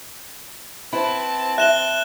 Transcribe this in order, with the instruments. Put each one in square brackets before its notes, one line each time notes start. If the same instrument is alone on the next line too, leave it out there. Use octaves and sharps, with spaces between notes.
[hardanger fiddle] C4 A5 [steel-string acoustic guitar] E4 B4 C5 [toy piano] B5
[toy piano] E5 [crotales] F#6 E7 G7